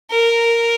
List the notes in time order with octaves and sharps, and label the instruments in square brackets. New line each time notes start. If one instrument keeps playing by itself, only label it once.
[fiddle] A#4